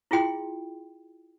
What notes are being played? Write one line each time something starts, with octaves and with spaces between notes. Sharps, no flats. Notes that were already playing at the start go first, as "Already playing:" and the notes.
E4 F4 G#4 G5 C6